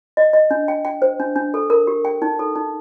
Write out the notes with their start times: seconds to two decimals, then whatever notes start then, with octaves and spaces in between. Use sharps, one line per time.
0.17 D#5
0.33 D#5
0.51 D4
0.68 G5
0.85 G5
1.02 C5
1.20 D4
1.36 D4
1.54 A4
1.70 A#4
1.87 G4
2.05 G5
2.22 D#4
2.39 A4
2.55 D#4